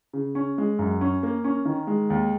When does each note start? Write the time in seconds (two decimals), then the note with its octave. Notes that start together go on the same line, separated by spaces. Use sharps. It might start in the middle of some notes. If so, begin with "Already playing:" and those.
0.13 C#3
0.35 C#4
0.58 G#3
0.79 F#2
1.01 C#4
1.23 A#3
1.44 C#4
1.65 D#3
1.87 G#3
2.10 D#2